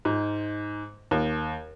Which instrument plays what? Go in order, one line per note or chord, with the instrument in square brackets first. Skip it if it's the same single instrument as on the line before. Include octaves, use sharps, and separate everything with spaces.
[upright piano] G#2
D#2